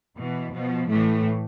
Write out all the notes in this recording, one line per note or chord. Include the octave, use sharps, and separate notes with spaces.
B2 E3
B2 F3
A2 E3 A3